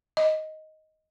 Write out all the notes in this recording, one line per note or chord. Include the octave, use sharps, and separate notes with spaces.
D#5